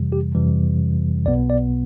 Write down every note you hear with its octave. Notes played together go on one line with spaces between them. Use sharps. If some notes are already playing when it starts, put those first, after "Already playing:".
Already playing: F2 C3 E3 G3
G4
F2 C3 E3 G3
B1 B2 B3 D5
D5